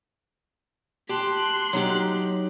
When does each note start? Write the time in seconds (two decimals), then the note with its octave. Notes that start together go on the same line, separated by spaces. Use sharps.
1.09 G4 G5 A5 C6 F#6
1.73 F#3 D#4 G4